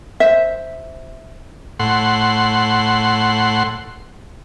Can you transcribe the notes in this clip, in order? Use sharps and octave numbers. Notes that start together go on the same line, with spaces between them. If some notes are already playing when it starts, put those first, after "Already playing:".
C5 E5
A2 F#5 C6